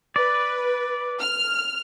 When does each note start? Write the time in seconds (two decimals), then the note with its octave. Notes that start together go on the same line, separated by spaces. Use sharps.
0.16 B4 D5
1.21 F6